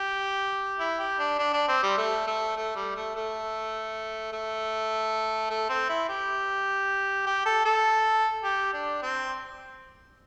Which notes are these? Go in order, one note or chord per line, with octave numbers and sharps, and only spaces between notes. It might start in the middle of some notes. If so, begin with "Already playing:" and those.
Already playing: G4
E4
G4
D4
D4
D4
C4
G3
A3
A3
A3
G3
A3
A3
A3
A3
C4
E4
G4
G4
A4
A4
G4
D4
C4